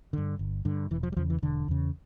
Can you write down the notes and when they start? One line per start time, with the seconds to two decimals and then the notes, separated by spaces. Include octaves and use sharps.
0.13 G2 D3
0.39 G1
0.65 G2 D3
0.91 E1 E3
1.03 F3
1.12 G3
1.17 E2 C#3 F3
1.30 E3
1.42 E1 D3
1.68 E2 C#3